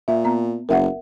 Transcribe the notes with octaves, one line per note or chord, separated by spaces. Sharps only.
A#2 E5
B3 A#5
F#1 A#4 E5 F#5